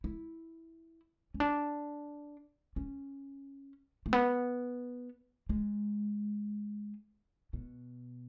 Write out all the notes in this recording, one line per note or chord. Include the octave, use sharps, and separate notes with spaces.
E4
C#4
D4
C#4
A3
B3
G#3
B2